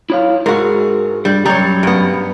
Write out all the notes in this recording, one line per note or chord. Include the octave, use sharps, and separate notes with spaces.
E4 C#5 F5
G#2 F#4 G#4 A#4
G2 G3
F#2 G3 C#5 A#5
G2 B3